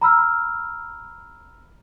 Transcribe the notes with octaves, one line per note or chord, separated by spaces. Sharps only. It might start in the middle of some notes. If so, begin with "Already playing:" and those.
A#5 B5 E6 F6